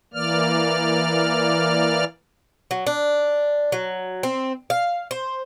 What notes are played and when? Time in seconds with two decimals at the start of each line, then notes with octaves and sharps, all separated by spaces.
0.14 E3 A#3 D5 F6
2.71 F#3
2.87 D4
3.72 F#3
4.23 C4
4.70 F5
5.11 C5